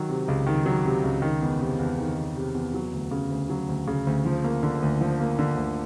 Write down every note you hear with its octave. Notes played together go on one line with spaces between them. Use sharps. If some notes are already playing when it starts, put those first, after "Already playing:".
Already playing: D#3 F#3
C3
C#2
D#3
F#3
C3
C#2
D#3
E2
C3
E2
D#3
E2
C3
E2
F#3
D2
C#3
D2
F#3
D2
C#3
D2
F3
A#3
D3
D2
F3
A#3
D3
D2